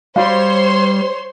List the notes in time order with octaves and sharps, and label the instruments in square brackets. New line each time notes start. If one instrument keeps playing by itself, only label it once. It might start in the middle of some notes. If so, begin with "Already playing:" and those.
[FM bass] G3 [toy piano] F#4 F5 [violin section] C5 C#5 C6